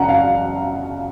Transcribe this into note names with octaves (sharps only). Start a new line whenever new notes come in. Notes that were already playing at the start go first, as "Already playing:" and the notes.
Already playing: F#2 C#3 F#5 A#5
F5